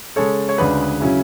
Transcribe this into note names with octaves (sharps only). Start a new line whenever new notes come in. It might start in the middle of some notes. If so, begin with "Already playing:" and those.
C#3 G#3 C#4 A4 C#5
C#5
D2 C#3 G#3 D4 G#4 B4
C#3 F#3 C#4 E4